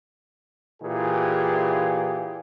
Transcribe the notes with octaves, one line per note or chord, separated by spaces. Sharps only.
A#2 E3 F4 G4 G#4